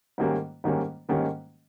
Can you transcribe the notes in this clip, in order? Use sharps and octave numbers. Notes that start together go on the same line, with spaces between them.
G#2 D#3 G3 A#3 C#4
G#2 D#3 G3 A#3 C#4
G#2 D#3 G3 A#3 C#4